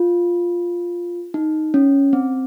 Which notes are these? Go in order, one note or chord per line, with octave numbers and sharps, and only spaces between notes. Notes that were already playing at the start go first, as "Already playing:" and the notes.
Already playing: F4
D#4
C#4
C4